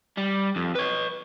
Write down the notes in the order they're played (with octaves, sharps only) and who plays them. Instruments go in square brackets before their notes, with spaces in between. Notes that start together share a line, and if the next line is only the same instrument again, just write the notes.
[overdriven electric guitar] G3
F2
B4 C#5